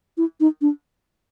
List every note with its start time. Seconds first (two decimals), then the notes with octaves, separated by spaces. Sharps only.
0.17 E4
0.40 D#4
0.61 D4